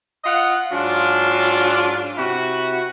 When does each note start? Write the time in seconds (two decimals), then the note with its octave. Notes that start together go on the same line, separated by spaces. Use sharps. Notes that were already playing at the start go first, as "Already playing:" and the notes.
0.24 F4 D#5 F#5
0.72 G#2 F#3 D4 F4
2.17 C3 E4 F#4